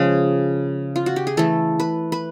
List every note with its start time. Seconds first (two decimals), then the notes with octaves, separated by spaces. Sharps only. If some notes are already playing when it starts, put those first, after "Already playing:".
Already playing: C#3 F3 G#3 G#4
0.96 F4
1.06 F#4
1.16 G4
1.27 G#4
1.37 E3 A3 A4
1.80 B4
2.12 B4